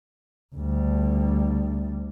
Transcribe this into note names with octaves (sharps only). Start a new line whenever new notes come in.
D2 G3